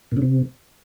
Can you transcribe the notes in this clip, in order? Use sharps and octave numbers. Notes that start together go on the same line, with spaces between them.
A#2
C#3
C3